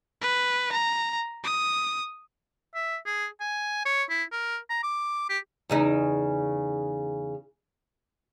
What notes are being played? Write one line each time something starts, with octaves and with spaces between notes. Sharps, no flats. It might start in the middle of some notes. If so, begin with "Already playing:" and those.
B4
A#5
D#6
E5
G#4
G#5
C#5
E4
A#4
A#5
D6
G4
E2 C#3 D#4